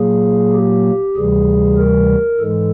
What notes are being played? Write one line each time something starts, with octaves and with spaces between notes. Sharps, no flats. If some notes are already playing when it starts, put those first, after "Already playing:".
Already playing: A#2 F#3 A#3 G#4
G4
D2 C3 E3 G3 G#4
A#4
G#2 E3 G#3 A4